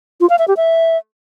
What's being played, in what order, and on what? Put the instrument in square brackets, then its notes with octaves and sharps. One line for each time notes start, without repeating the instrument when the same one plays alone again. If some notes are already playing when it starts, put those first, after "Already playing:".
[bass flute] F4
F5
E5
G4
E5